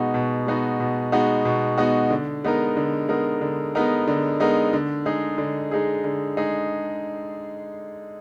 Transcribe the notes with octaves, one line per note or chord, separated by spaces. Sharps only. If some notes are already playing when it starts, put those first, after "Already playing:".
Already playing: B2 G#3 B3 D#4 F#4
B2
G#3 B3 D#4 F#4
B2
G#3 B3 D#4 F#4
B2
G#3 B3 D#4 F#4
D3
G#3 B3 D#4 A#4
D3
G#3 B3 D#4 A#4
D3
G#3 B3 D#4 A#4
D3
G#3 B3 D#4 A#4
D3
G#3 D#4 G#4
D3
G#3 D#4 G#4
D3
G#3 D#4 G#4